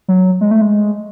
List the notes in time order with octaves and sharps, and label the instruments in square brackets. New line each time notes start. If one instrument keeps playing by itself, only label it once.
[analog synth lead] F#3
G#3
A3
G#3